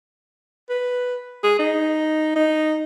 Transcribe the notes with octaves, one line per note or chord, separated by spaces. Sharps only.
B4
G#4
D#4
D#4